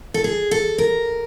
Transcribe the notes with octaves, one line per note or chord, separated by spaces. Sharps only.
A4
G#4
A4
A#4